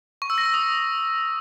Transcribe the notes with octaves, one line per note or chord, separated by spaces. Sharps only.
C#6
E6
A#6
E6
D#6